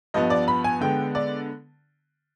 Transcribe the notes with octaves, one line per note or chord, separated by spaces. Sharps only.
G2 F3 B3 D#5
D5
B5
G#5
D3 G#3 B3 G5
D5